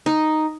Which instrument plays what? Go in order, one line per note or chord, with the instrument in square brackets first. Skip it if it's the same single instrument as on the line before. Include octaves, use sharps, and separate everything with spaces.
[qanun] D#4